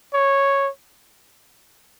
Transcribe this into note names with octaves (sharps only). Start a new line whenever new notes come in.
C#5